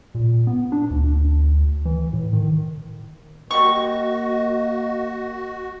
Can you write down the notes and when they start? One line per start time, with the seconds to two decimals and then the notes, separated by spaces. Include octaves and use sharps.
0.15 A#2
0.47 B3
0.72 D4
0.91 D2
1.85 E3
2.13 A2
2.33 D#3
3.51 G3 A#3 F#4 D#5 C#6